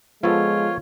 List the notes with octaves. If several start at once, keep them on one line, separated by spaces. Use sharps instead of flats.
F3 G#3 B3 F4 A4 C#5